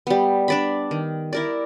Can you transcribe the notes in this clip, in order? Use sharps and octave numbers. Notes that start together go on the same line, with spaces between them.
G3 B3
D4 D5 B5
D#3
E4 A#4 D5